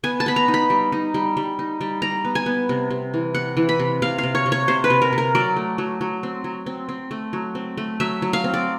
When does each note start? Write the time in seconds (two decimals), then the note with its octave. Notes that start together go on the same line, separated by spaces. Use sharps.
0.04 B3 G#5
0.20 A5
0.26 B3 B5
0.36 A#5
0.48 D#4
0.54 B5
0.70 G3
0.92 D#4
1.14 G3
1.37 G3
1.59 D#4
1.81 G3
2.02 G3 A#5
2.25 B3
2.35 G#5
2.46 B3
2.69 C3
2.90 C3
3.14 E3
3.35 C3 F#5
3.57 E3
3.69 B5
3.80 C3
4.02 C3 F5
4.18 F5
4.23 C3
4.35 C#5
4.46 C3
4.52 C#5
4.68 C3 C5
4.84 B4
4.90 C3
5.02 A#4
5.13 C3
5.18 A#4
5.35 F#3 D5
5.56 A3
5.78 F#3
6.01 F#3
6.23 C4
6.44 F#3
6.66 C4
6.89 C4
7.11 A3
7.33 F#3
7.55 C4
7.77 A3
8.00 F#3 E5
8.22 F#3
8.33 F5
8.44 C4
8.54 D5